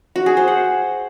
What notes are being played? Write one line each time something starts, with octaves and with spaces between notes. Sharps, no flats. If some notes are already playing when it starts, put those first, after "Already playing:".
F#4
G#4
C5
F#5